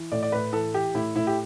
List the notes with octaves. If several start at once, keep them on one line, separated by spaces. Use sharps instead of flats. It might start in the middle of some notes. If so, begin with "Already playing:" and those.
Already playing: E3
A2 D5
D5
A2 B4
E3 A4
E3 G4
A2 E4
A2 E4
G4